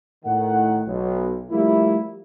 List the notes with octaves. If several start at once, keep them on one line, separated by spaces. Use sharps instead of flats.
A2 D#3 F#5
B1
F3 G3 A3 A#3 E4